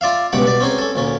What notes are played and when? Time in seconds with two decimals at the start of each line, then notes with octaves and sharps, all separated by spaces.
0.01 F4 D5 E5 F5
0.33 C#2 G2 B2 G4 F#5 D6
0.44 B2 D5
0.60 C4 C#4 D#4 G#4
0.78 C#4 A4
0.96 D2 A#2 C#4